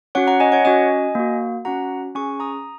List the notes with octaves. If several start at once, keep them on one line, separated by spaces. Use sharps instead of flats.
C#4 F#4 C#5 F#5
F#5 A#5
D#5 G#5
C#5 F#5
C#4 F#4 D#5 G#5
A#3 F#4
C#4 F#4 F#5 A#5
C#4 G#4 G#5 C#6
A#5 D#6